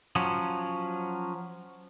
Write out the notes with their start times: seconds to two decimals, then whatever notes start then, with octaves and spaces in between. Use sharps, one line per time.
0.16 F3 F#3 C#4